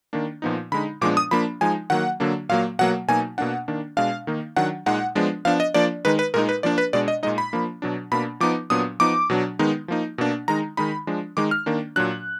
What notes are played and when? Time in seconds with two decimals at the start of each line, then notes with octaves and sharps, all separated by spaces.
0.13 D#3 A#3 D4
0.42 A#2 F3 B3 D#4
0.72 D3 G#3 D#4 B5
1.01 A#2 F3 G#3 B3 D4 D6
1.17 D#6
1.31 F3 A#3 D4 B5
1.61 F3 G#3 D#4 G#5
1.90 D#3 F#3 A#3 F#5
2.20 D3 F#3 A#3 D4
2.49 A#2 F#3 A#3 F5
2.79 B2 F#3 A#3 F#5
3.08 B2 F#3 A#3 D#4 G#5
3.38 B2 A#3 D4 F#5
3.68 D#3 A#3 D4
3.97 B2 G#3 D4 F5
4.27 D#3 A#3 D#4
4.56 D#3 F#3 D4 F#5
4.86 A#2 G#3 D#4 F#5
5.15 F3 G#3 B3 D4
5.45 F3 B3 D4 F5
5.60 D#5
5.74 F3 A#3 D4 D5
6.05 D#3 G#3 D#4 B4
6.19 B4
6.34 A#2 G#3 D#4 A#4
6.49 B4
6.63 F3 A#3 D4 D5
6.78 B4
6.93 B2 G#3 D4 D5
7.08 D#5
7.23 A#2 G#3 D#4 D#5
7.38 B5
7.53 F3 A#3 D4
7.82 B2 F#3 D4
8.12 B2 A#3 D4 B5
8.40 F3 B3 D#4 D6
8.70 A#2 F#3 B3 D4 D#6
9.00 F3 B3 D#4 D6
9.30 B2 F#3 D4
9.59 D#3 G#3 B3 D#4
9.88 F3 A#3 D#4
10.18 B2 A#3 D4
10.48 D#3 G#3 D#4 A#5
10.77 D#3 G#3 D#4 B5
11.07 F3 G#3 D4
11.37 D#3 G#3 D#4 D6
11.51 F6
11.66 D#3 A#3 D4
11.96 A#2 F#3 D4 F#6